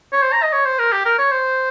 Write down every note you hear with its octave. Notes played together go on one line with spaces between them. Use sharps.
C#5
C5
A#5
D#5
C#5
C5
A#4
G4
A#4
C#5
C5